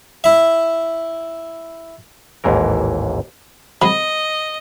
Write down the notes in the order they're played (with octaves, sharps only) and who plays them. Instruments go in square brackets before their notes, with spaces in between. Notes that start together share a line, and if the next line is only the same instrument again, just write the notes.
[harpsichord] E4 E5
[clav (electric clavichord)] A1 D#2 G#2 E3 A#4
[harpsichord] F#3 G#3 C4 [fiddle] D#5 [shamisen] B5